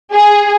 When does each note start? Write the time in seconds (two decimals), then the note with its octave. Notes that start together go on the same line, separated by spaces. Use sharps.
0.13 G#4